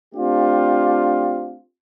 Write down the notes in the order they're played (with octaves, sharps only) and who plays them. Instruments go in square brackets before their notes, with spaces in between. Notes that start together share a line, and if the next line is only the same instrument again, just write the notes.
[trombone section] A3 C4 D4 F4 G4